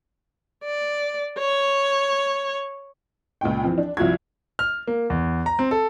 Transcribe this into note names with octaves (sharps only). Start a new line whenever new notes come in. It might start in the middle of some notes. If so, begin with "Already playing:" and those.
D5
C#5
C#2 A#2 G5
E3 F3 C4
D4
C2 F3 F4 F#4 G#6
F6
A#3
E2
A#5
C4
A4